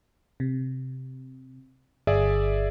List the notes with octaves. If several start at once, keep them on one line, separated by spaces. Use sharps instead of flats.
C3
G1 G#4 D5 E5